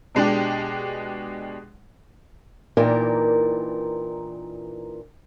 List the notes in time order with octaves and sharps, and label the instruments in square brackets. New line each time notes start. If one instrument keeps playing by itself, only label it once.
[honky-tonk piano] B2 G#3 D4 G4
[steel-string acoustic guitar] A#2 E3 D4 D#4 A#4 G5